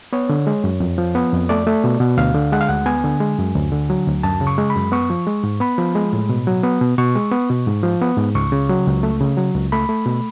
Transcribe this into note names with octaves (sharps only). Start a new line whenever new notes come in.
B3 C#5
D3
G#3
F#2
F2
F3
B3
F2
A3 D5
A3
B2
B2
D2 F5
D3
G#3 F#5
F5
D2 F#5
B3 G#5
D3
G#3
F#2
D2
D3
F#3
D2
F#2 A5
C#3
C#6
G#3
B5
F#2
B3 C#6
F3
G#3
G#2
B3 B5
F3
G#3
A2
B2
F#3
B3
B2
B2 C#6
G#3
B3
B2
G#2
F3
B3
G#2
C#2 C#6
C#3
F#3
C#2
A3
C#3
F#3
C#2
A3 B5
A3
B2